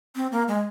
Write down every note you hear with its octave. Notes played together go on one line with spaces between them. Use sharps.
C4
A#3
G#3